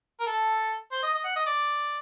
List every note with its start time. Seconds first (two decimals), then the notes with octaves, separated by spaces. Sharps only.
0.20 A#4
0.27 A4
0.92 C5
1.03 D#5
1.14 D#5
1.25 F#5
1.36 D#5
1.47 D5